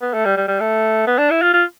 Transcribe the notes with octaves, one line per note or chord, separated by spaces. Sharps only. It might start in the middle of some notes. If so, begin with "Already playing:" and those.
B3
A3
G3
G3
G3
A3
B3
D4
E4
F4
F4